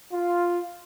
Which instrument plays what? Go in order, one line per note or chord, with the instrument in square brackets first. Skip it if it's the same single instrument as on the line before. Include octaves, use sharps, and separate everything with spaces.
[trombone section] F4